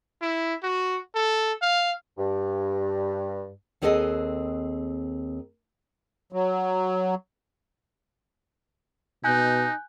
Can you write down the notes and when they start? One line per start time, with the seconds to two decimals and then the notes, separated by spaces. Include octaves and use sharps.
0.22 E4
0.63 F#4
1.15 A4
1.62 F5
2.17 G2
3.82 D#2 C4 G#4 A4 B4 D#5
6.33 F#3
9.24 B2 D#4 G#5 F#6 G6